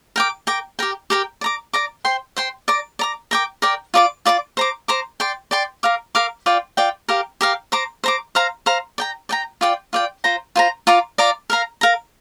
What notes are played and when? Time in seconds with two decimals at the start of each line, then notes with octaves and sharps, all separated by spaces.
0.16 A#4 G5 D6
0.47 A#4 G5 D6
0.79 G4 A#4 G5
1.10 G4 A#4 G5
1.41 D5
1.44 A#5 D6
1.73 D5 A#5 D6
2.05 C5 G5 C6
2.37 C5 G5 C6
2.68 D5 A#5 D6
2.99 D5 A#5 D6
3.31 A#4 D5 G5 D6
3.62 A#4 D5 G5 D6
3.94 F4 D5 A#5 D6
4.25 F4 D5 A#5 D6
4.57 C5 A#5 D6
4.88 C5 A#5 D6
5.20 D5 G5 C6
5.51 D5 G5 C6
5.83 A#4 F5 D6
6.15 A#4 F5 D6
6.46 F4 D5 G5
6.77 F4 D5 G5
7.08 G4 A#4 F5
7.41 G4 A#4 F5
7.72 C5 A#5 D6
8.04 C5 A#5 D6
8.35 C5 F5 A#5
8.66 C5 F5 A#5
8.98 D5 G5 A#5
9.29 D5 G5 A#5
9.61 F4 D5 G5
9.93 F4 D5 G5
10.24 F4 C5 A#5
10.56 F4 C5 A#5
10.87 F4 D5 A#5 D6
11.18 F4 D5 A#5 D6
11.50 A#4 F5 A#5
11.81 A#4 F5 A#5